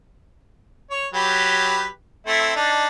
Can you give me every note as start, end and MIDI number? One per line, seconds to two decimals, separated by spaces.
0.90 1.07 73
1.14 1.86 54
1.14 1.86 67
1.14 1.86 71
2.27 2.53 57
2.27 2.53 60
2.27 2.53 64
2.56 2.87 62
2.56 2.87 63